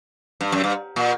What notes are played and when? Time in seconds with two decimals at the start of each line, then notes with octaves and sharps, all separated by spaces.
0.41 G2
0.52 F#2
0.64 G2
0.96 A#2